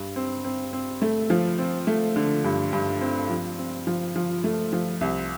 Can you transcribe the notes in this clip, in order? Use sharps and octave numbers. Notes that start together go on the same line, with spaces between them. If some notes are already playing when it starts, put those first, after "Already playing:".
Already playing: G2
C4
C4
C4
A3
F3
C4
A3
D3
G2
G2
C4
F3
C4
F3
F3
A3
F3
C2